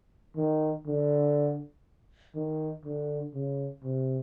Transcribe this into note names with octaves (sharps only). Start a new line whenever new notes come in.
D#3
D3
D#3
D3
C#3
C3